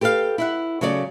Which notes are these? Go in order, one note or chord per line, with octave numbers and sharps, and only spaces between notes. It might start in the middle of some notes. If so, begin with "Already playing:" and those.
G4 A4 B4 E5 F5
E4 E5 F#5
C#3 F#3 A3 C#5 D5